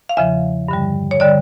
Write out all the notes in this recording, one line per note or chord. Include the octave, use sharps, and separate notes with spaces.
F5
E2 C#3 F3 E5
G2 D3 G3
C#5
D3 G3 D5